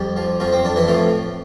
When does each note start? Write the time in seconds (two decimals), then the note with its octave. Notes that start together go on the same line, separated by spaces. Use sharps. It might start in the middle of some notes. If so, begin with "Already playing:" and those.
Already playing: F2 G3 G4
0.16 F3
0.40 F2 F3 F4
0.53 C4
0.64 F2 D4
0.76 E3 E4
0.88 A2 F3 F4